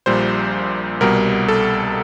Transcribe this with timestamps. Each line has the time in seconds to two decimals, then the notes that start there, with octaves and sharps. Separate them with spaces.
0.06 A#1 A#2 G3 C5
1.01 C2 B2 G3 A#4
1.48 A4